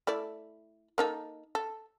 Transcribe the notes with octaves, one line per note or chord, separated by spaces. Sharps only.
A3 E4 D5
A#3 D#4 A4
A4